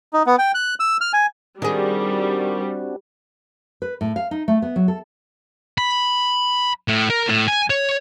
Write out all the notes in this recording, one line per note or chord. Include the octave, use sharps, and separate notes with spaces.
D#4
B3
G5
F#6
E6
F6
G#5
D#3 G3 C4 D4 F#4 G#4
B4
A2
F5
D#4
A3
B3
F#3
A4
B5
A2
A#4
A2
G#5
C#5